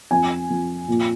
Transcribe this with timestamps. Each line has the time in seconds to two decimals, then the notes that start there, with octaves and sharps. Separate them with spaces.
0.11 F2 G#5
0.50 F2
0.88 A#2